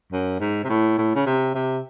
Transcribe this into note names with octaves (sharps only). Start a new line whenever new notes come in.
F#2
G#2
C3
A2
A2
C#3
C3
C3